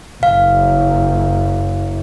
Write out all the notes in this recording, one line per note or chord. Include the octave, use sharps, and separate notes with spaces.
F#1 F#2 F5